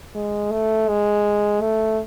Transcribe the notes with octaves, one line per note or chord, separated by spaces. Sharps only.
G#3
A3
G#3
A3